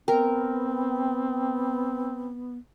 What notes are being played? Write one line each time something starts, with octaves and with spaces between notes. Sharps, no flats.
B3 C4 A#4 G5